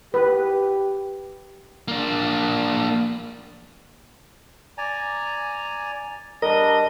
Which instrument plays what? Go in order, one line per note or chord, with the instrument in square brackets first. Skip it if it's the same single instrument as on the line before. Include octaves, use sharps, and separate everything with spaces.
[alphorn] G4 [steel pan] B4
[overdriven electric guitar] A#3 D4
[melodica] D5 G#5 A#5
[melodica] G3 D4 [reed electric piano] A#4 [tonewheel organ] D#5